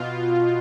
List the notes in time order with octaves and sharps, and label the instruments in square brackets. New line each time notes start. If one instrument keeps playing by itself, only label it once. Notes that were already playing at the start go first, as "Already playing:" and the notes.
Already playing: [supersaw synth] B2 F4